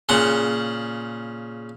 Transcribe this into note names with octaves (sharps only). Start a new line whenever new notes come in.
A#2 C#3 F#5